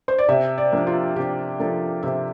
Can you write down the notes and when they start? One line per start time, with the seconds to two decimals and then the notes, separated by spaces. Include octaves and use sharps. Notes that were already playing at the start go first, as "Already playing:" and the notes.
0.08 C5
0.18 D5
0.29 C3 E5
0.58 D5
0.72 F3 A#3 D4
0.87 F4
1.16 C3 G4
1.59 F3 A#3 D4 A4
2.03 C3 E5